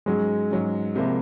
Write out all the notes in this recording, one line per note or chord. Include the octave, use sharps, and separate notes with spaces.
G#2 F#3 G#3 C#4
G#2 F#3 C#4
C2 C3 F3 A#3